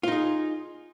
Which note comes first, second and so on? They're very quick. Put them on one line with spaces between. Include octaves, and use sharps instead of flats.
F4 D#4 G#4